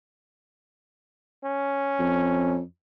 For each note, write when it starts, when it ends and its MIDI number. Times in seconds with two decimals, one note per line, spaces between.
1.45 2.58 61
1.99 2.62 41